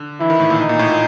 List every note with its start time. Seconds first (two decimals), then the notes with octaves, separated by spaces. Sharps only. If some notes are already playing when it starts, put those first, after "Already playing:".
Already playing: D3
0.20 E3 E4
0.30 D#3
0.40 A2
0.50 A#2
0.60 D#4
0.69 A#2
0.79 A2
0.89 A#2